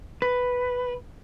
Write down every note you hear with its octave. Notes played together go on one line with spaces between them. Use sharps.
B4